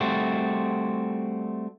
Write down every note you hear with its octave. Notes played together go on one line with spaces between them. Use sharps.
G3 A3 C4 F#4